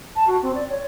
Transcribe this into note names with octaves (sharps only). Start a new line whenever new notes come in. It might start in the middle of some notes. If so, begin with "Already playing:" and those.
A5
F#4
C4
D5
C#5